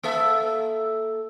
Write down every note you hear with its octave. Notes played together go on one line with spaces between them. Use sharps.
A#3 A4 E5